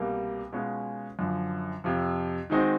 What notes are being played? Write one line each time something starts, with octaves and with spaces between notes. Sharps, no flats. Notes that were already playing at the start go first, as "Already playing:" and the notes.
Already playing: C2 B2 G3 A#3
B2 G#3 C#4 F4
F#2 D3 F3
F2 C3 F3
D#3 G#3 C4 D#4 F#4